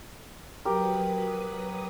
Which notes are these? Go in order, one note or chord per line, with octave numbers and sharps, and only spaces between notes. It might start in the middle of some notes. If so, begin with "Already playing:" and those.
F#3 G4 A#4 B4 D#6